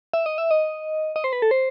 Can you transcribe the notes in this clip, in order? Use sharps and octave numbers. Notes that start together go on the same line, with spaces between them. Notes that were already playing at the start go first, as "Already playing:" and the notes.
E5
D#5
E5
D#5
D#5
C5
B4
A4
C5